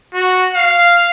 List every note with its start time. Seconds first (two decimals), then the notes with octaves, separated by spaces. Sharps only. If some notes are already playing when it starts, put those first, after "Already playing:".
0.14 F#4
0.54 F5